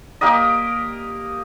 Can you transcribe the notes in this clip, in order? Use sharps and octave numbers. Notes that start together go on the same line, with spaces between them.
A#3 G4 A#4 D#5